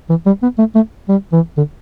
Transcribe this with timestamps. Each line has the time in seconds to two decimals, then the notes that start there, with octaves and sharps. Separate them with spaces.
0.09 E3
0.26 G3
0.43 B3
0.58 A3
0.75 A3
1.09 G3
1.32 E3
1.57 D3